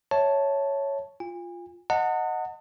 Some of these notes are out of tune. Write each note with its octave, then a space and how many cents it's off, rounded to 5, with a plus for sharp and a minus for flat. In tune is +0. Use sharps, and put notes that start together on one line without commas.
C#5 +0 E5 -10 A5 +0
F4 +0 G#5 -40
D#5 +0 F#5 -10 A5 +45